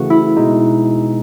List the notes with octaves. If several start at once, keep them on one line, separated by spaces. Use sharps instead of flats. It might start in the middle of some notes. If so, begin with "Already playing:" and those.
Already playing: C#3 E3 A3 F#4
E4
B2 G#3 D#4